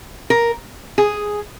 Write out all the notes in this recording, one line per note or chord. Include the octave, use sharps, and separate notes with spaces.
A#4
G#4